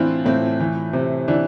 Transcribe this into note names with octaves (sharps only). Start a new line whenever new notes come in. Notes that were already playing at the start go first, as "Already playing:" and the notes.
Already playing: A2 E3 C4 D4 E4 F4
A2 C4
E3
C3
E3 D4